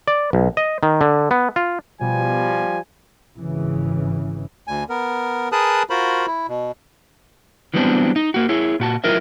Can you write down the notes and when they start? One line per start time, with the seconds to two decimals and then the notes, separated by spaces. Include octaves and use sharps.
0.08 D5
0.33 B1
0.57 D#5
0.83 D#3
1.01 D3
1.31 B3
1.56 F4
2.01 B2 F3 G3 G#5
3.37 G#1 C#3 E3
4.68 D2 G#5
4.89 B3 A#4
5.52 G#4 A#4 B4 A5 D#6 F#6
5.90 F4 F#4 A#4 C5 B5
6.26 E4
6.48 B2
7.74 E3 F#3 G3 B3 C4 D4
8.16 D#4
8.34 A#3 F#4
8.49 E4 G#4 C#5
8.80 A#2 F#4 A5
9.04 F#3 E4 F4 A#4 D#5 E5